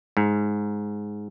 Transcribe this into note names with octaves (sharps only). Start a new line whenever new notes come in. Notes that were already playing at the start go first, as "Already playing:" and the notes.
G#2